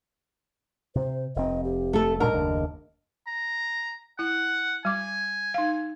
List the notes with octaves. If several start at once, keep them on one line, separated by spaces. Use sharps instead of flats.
C3 C5
F1 C4 D#5
G4
A3 A4
A#2 G3 D4 A#4 D#5
F#1 D#2 D4
A#5
E4 F#5
G3 G#5 D6
D#4 F5